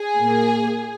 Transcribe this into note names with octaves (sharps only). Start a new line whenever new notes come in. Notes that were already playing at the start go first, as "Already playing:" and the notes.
Already playing: G#4 G#5
A#2 A#3